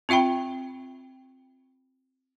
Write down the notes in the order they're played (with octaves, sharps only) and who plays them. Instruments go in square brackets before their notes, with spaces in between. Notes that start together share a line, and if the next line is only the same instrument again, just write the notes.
[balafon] C4 F4 E5 G5 B5